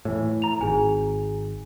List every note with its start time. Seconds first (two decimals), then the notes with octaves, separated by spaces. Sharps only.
0.05 A2 E3
0.42 A#5 F7
0.61 G#1 G#4 G#5